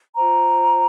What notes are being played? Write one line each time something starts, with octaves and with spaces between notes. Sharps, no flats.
F4 C5 A#5